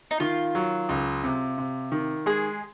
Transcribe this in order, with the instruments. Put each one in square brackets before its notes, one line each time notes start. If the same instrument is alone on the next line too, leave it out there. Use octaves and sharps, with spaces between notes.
[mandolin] D#4
[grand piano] D#3 [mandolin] F4
[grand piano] F#3
C#2
C3
C3
D#3
[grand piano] G#3 [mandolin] G#4